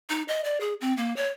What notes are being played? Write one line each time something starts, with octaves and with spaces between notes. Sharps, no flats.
D#4
D#5
D5
G#4
C4
A#3
C#5